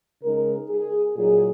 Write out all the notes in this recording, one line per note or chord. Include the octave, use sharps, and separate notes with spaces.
C#3 G#3 D#4 A#4
G#4
A#2 F#3 D#4 G#4